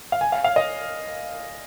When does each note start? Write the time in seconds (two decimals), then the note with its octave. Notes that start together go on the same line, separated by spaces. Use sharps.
0.12 F5
0.21 G#5
0.32 F5
0.44 F5
0.56 D#5